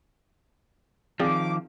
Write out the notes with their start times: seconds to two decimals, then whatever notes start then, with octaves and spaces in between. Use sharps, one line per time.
1.20 D#3 F3 C4 G#4 D5 D6